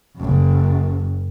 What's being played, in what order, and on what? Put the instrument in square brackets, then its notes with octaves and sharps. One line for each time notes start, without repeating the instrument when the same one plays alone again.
[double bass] F#1 F#2